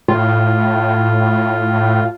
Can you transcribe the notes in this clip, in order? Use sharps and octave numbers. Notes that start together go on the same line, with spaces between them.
A2 F4